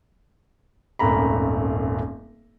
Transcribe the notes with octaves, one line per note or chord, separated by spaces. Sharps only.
D#1 G#1 F#2 A3 A#5 B5